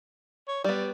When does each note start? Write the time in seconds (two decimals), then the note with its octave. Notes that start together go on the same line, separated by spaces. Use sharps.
0.48 C#5
0.64 G3 B3 D5